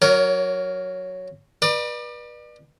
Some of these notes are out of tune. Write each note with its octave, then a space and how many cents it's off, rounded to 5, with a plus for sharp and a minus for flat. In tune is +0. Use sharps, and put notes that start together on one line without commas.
F#3 +0 A#4 +0 C#5 +35
B4 -30 D5 +35